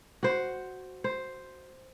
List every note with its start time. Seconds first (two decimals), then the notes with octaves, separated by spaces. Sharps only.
0.23 F#4 C5
1.04 C5